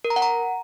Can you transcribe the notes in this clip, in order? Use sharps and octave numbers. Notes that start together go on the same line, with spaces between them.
A#4
A#5
F#5
A#5